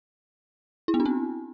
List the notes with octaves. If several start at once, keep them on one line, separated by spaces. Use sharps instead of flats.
E4
B3
D4
C4